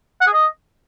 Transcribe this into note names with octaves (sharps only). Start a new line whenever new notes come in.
F#5
G#4
D#5